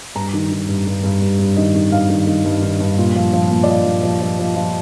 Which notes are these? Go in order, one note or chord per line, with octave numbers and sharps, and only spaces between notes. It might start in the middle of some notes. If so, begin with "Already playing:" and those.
G2 A#5
D#3
D#3
G2
G2
G2
G2
G2
D#3 D#5
D#3
G2 F5
D#3
D#3
G2
D#3
G2
A#2
F3
F3
A#2
D5
F3 D#5
F3
F3
F3
F3
F3